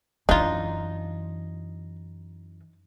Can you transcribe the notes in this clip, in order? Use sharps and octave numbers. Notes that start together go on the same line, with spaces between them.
F#2 E3 D4 D#4 F4